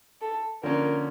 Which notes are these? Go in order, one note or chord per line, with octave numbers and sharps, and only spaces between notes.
A4
D3 F3 A#3 C#4 A#4